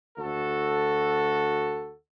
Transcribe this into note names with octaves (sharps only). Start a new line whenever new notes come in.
D2 F#4 A4